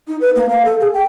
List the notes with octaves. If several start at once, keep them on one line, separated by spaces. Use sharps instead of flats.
D#4
B4
A#3
F5
A4
G#4
G5